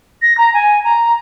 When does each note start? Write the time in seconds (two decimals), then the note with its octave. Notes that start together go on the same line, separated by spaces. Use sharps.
0.22 A#6
0.38 A#5
0.54 G#5
0.84 A#5